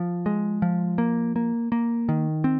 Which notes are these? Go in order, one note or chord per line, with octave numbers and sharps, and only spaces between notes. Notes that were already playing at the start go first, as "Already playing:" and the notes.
Already playing: F3
G#3
F3
A#3
A#3
A#3
D#3
C4